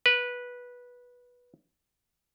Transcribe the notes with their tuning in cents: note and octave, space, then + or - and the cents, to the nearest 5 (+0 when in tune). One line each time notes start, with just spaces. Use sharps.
B4 -10